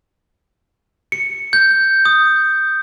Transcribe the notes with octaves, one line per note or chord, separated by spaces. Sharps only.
C#7
G6
D#6